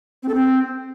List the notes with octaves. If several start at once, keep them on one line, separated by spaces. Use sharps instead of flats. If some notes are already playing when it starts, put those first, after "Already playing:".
C4
A4
C4